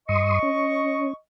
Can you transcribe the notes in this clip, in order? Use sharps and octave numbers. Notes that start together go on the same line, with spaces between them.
G2 D#5 C6 C#6 D#6
C#4